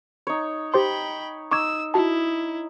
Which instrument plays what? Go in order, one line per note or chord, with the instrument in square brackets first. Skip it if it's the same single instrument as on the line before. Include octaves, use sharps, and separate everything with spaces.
[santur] D#4 C#5
[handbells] G4 C5 C6 [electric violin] G5 B5
[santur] D#4 [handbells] C#6 D6 G#6 [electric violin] E6
[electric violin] E4 [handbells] F#4 A5